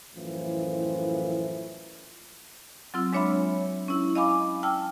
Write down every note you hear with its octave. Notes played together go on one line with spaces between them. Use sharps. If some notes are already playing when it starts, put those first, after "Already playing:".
F#2 A2 E3 F3
F#3 C4 F4 E6
G#3 D4 C#5 E5 B5
C#4 E4
D#5 F5 G#5 B5 D6
G5 A5 E6 F6